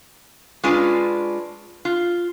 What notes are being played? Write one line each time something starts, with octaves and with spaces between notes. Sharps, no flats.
G#3 C#4 D4 F4 B4
F4